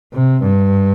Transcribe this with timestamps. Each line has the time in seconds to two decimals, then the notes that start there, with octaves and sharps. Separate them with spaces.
0.13 C3
0.43 G2